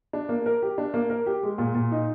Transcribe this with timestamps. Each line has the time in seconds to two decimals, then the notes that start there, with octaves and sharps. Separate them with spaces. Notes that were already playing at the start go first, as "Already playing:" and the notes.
0.13 D4
0.29 A#3
0.46 A#4
0.62 G4
0.78 D4
0.94 A#3
1.10 A#4
1.26 G4
1.43 G#3
1.58 A#2
1.75 A#2
1.92 D#4